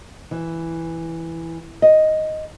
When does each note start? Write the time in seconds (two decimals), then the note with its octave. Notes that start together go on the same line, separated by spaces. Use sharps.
0.31 E3
1.82 D#5